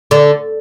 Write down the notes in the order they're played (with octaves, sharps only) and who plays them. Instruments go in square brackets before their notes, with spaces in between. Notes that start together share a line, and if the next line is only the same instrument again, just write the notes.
[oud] D3